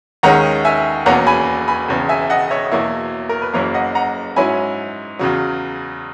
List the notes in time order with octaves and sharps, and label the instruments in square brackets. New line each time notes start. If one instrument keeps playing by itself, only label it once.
[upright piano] D#2 D#3 G#3 C#4 F#5 A#5
E5 G#5
E1 E2 B2 A#3 C#4 F#5 A#5
G#5 B5
G#5 B5
E1 E2 C#3
E5 G#5
D#5 F#5
C#5 E5
E2 B2 F#3 A#3 E4
A#4
B4
F#1 F#2 E3 A#3 A#4 C#5
D#5 F#5
F#5 A#5
G#2 F#3 C#4 E4 G#5 B5
E2 C#3 F#3